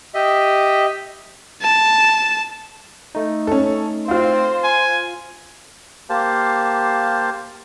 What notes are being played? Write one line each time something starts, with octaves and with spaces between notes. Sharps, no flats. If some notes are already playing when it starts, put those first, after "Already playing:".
G4 D#5 E5
A5
A3 D#4
C#4 A4
C4 F4 C5 F5
G#5
A#3 G4 C5 F5 A5